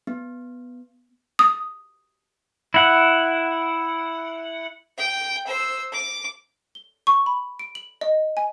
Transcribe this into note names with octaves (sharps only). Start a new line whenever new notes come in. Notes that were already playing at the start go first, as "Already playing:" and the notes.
B3
D#6
E4 F#5
G5
C5 E6
D6
G7
C#6
B5
D7
F#7
D#5
G#5